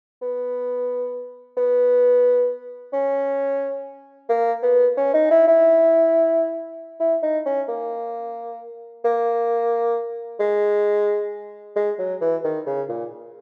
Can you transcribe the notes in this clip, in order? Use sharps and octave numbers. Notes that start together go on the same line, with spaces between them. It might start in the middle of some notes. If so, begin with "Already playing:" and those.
B3
B3
C#4
A#3
B3
C#4
D#4
E4
E4
E4
D#4
C#4
A#3
A#3
G#3
G#3
F#3
E3
D#3
C#3
A#2